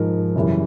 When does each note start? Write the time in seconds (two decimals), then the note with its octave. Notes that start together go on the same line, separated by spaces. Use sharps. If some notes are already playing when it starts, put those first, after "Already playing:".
Already playing: G#2 F3 A#4
0.35 F#2 C#3 E3 G3